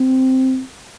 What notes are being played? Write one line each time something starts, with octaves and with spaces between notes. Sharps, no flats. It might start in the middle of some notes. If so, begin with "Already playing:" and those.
Already playing: C4